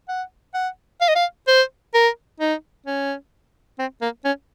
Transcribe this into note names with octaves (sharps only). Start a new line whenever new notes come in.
F#5
F#5
F5
D#5
F5
C5
A#4
D#4
C#4
C4
A#3
C#4